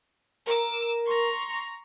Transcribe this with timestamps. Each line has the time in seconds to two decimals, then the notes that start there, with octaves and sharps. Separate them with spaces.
0.47 A#4 D6 E6
1.05 A#5 C6 C#6